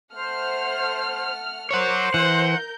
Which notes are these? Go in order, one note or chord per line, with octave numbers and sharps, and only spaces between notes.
A3 C5 F#5 F6
A#4 C5 C#5 F#5 D6
E3 A#4 F#5 G6